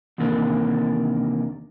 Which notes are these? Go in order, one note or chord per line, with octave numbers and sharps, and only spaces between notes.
E2 C3 D#3 A#3 D4